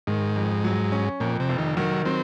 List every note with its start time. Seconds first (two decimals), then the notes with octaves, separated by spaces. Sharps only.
0.07 G#2 D#3
0.36 F2
0.64 F#3
0.92 C#4
1.20 F2 A#2
1.40 C3
1.49 F1
1.58 D#3
1.77 D#3 F#3
2.05 F#3 C4